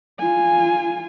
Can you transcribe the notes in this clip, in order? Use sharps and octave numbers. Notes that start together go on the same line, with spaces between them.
F4 G#5